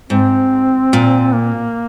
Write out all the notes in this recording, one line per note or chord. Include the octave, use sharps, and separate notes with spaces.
G#2 C4
A#2
A#3